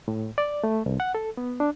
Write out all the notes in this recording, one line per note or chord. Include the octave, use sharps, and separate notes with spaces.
A2
D5
A3
C2
F#5
A4
B3
D4